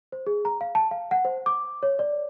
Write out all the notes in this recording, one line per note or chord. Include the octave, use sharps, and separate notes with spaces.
C5
G#4
A#5
F5
A5
F5
F#5
C5
D6
C#5
D5